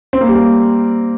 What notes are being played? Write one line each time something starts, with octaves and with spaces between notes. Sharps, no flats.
C4
A#3
G3
A#3